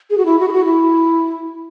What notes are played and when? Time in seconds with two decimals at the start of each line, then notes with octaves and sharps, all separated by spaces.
0.10 G#4
0.18 F#4
0.25 E4
0.39 F#4
0.48 G#4
0.52 F#4
0.65 E4